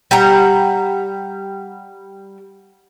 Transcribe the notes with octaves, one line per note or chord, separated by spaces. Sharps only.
G3 F#5 A#5